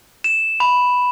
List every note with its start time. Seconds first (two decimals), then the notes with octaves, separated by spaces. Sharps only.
0.24 E7
0.60 B5